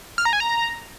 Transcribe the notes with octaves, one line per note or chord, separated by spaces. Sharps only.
F6
A#5
G#5
A#5